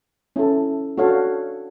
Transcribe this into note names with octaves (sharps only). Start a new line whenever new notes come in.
C#4 E4 A4
D4 F#4 A4 C#5 F5